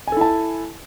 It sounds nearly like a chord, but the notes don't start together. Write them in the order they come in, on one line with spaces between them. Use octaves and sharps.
G#5 A4 E4 A5